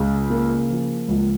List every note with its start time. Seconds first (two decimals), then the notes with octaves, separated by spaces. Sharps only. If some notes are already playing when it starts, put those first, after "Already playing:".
Already playing: C#2 C#3
0.30 A#3
0.70 F3
1.08 C#2